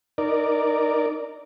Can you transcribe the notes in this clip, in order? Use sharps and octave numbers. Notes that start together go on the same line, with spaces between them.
D#4 A#4 D5